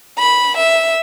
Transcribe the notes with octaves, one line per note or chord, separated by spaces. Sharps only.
B5
E5